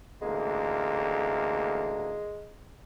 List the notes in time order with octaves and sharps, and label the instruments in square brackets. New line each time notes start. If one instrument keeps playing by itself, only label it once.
[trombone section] A1 D2 A#3 [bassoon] G#3